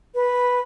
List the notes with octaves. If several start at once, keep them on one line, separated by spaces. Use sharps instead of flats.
B4